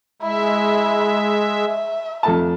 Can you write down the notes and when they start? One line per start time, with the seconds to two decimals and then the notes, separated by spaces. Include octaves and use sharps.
0.22 G#3 E4 E5
1.66 E5
2.23 F2 A3 A5